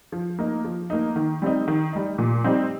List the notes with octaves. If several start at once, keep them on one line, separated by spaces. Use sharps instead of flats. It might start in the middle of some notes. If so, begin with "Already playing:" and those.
F3
A#3 D#4
F3
A#3 D#4
D#3
G3 C4 D#4
D#3
G3 D#4
A#2
G3 C4 D#4